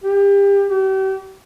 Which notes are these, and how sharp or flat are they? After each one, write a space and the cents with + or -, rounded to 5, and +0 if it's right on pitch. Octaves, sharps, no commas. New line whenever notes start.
G4 +30
G4 -40